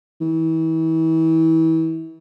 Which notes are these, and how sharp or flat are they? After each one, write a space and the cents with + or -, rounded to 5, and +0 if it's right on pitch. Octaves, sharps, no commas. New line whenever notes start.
E3 -35